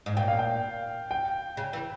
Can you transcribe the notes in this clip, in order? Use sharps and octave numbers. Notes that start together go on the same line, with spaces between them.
G#2
A#2 G5
F5
G5
G5
C#3
E3